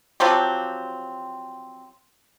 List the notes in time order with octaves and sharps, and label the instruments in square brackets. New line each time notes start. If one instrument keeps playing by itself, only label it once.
[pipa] F3 F#3 C4 G4